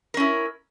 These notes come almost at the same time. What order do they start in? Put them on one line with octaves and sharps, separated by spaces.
A#4 C#4 E4